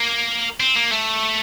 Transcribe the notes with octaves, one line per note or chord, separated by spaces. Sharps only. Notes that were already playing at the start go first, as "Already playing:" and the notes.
Already playing: A#3
C4
A#3
A3